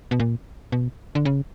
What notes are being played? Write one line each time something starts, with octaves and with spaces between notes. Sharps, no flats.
B2
A#2
B2
D3
C#3